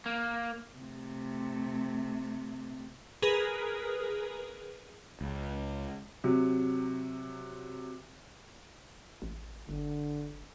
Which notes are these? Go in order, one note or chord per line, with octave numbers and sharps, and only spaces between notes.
A#3
C3 A3
G#4 A#4 B4
C#2
C3 F#3
A1
G1 D3